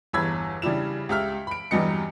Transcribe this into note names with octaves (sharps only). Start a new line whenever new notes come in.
G1 E2 E4 B5 E6 G#6
C#3 G3 D4 E4 E7
C#2 G4 E5 F6
B5 D7
E2 G2 F#3 G3 D#5 C#7